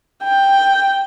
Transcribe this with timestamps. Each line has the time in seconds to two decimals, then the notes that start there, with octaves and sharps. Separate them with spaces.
0.24 G5